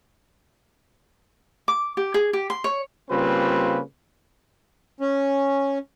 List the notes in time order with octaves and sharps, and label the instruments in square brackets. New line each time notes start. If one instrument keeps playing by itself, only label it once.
[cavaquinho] D6
G4
G#4
G4
C6
C#5
[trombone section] C#3 G3 A#3 C4 F4 B4
[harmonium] C#4